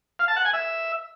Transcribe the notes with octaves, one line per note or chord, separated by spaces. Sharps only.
F5
A5
F#5
G#5
E5